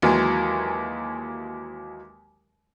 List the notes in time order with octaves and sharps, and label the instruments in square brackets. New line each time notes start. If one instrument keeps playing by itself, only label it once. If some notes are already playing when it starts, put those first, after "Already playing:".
[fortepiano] D#2 E3 F#3 G#3